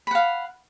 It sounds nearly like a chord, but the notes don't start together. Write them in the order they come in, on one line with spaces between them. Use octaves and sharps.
B5 F#5 F5